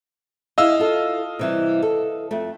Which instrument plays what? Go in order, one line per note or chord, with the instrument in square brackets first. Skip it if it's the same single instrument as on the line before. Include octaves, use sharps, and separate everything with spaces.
[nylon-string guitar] E4 G#4 [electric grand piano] D#5 F5 E6
[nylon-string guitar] F4 A4
C3 E3 G3
A4
F2 A3